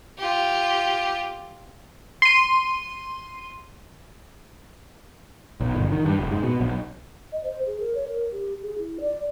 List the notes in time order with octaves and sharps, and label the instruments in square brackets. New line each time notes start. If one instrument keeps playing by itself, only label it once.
[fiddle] F4 G4
[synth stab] C6 D#7
[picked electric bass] B1
G1
D#3
G2
F1
G#2
B2
B1
[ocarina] D#5
C5
G#4
A#4
C#5
A#4
G4
G#4
E4
D5